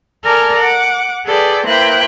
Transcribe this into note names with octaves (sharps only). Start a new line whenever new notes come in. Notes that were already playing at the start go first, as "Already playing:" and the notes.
A4 A#4 D5 G#5 A5 F6
F#5 D6
G#4 A4 B4 D5 G5
A#3 E4 B4 C5 G5 F#6